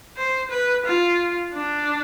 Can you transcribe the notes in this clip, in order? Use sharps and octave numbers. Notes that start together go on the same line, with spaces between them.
C5
B4
F4
D4